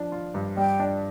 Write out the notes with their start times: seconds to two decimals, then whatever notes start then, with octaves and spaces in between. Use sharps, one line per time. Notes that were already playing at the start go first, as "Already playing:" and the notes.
Already playing: F3 D4
0.12 F4
0.34 G2
0.57 G3 G5
0.79 D4